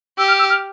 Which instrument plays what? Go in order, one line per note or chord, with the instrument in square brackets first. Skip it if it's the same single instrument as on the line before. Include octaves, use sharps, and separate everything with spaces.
[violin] G4 [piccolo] E6
[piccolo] F6
E6
F6